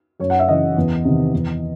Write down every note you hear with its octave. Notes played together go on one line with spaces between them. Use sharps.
F#2 C#5
F#5
E5
C#3 E3 D#5
E2
C3 D#3
E2